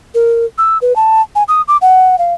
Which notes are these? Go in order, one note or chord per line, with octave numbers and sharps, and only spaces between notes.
A#4
E6
B4
A5
G#5
D#6
D6
F#5
F5